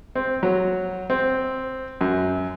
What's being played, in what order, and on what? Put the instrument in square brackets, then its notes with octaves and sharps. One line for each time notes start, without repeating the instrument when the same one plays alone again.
[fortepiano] C4
F#3
C4
F#2